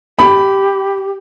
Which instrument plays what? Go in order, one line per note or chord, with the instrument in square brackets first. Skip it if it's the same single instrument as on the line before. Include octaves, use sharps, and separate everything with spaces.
[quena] G4 [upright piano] B5